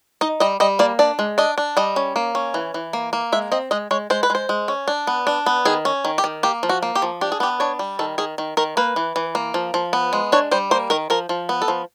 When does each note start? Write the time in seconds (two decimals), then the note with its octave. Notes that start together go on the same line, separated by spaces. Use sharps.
0.21 D#4 D#5
0.40 G3 D#5
0.60 G3 D#5
0.79 A#3 D5
0.99 D4 D5
1.19 G#3
1.38 D4 D#5
1.58 D4
1.77 G3 D#5
1.96 C#4
2.16 A#3
2.35 C#4
2.54 E3
2.74 E3
2.93 A#3
3.13 A#3
3.32 G#3 E5
3.52 C4 D#5
3.71 G#3 D#5
3.91 G#3 C#5
4.10 G#3 C5
4.23 B4
4.30 G#3 C5
4.49 G#3
4.68 C#4
4.88 D4
5.07 B3
5.27 D4
5.46 B3
5.65 D#3 G#4
5.85 C#4
6.05 D#3
6.18 G4
6.24 D#3
6.43 A#3 G4
6.63 F3
6.69 F#4
6.82 A#3
6.95 G4
7.02 F3
7.21 D4 G4
7.32 G#4
7.40 B3 G4
7.60 D4 C#5
7.79 G3
7.99 D#3 A4
8.18 D#3 G#4
8.38 D#3
8.57 D#3 A#4
8.77 A#3 B4
8.96 E3
9.16 E3
9.35 A#3
9.54 F3
9.74 F3
9.93 B3
10.13 G#3
10.32 D4 C#5
10.51 G3 C5
10.71 A#3 C5
10.90 D#3 A#4
11.10 F3 A#4
11.29 F3
11.49 B3
11.62 A4
11.68 F3